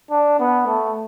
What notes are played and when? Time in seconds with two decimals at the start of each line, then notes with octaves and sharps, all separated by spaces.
0.11 D4
0.40 B3
0.67 A3